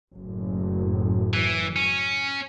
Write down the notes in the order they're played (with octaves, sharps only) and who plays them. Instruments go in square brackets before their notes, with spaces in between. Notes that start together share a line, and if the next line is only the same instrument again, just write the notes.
[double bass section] F#1 A2
[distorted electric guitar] E3
C#4